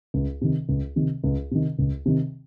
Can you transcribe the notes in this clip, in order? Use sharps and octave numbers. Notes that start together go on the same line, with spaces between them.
C#2
C3 D#3
C#2
C3 D#3
C#2
C3 D#3
C#2
C3 D#3